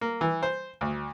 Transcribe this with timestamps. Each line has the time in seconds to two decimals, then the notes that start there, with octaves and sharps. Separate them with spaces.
0.01 A#3
0.21 E3
0.43 C5
0.81 D2